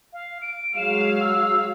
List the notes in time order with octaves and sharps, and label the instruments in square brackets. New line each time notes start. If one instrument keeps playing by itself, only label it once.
[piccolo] F5
D7
[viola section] F#3 G#3 F5 [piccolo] E7
[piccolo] E6